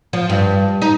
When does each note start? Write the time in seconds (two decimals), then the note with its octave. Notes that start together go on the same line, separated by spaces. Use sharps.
0.13 F3
0.30 G2
0.82 D#4